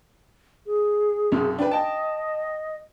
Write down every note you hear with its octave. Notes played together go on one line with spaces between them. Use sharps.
G#4
B1 F#2 C3
D4 B4 G5
D#5 G5 A5